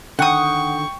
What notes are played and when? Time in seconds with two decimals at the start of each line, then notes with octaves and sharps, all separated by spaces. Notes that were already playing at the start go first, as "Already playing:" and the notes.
0.19 D3 D#3 F#5 G5 C#6 D#6